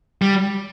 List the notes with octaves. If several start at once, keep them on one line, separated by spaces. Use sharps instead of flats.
G3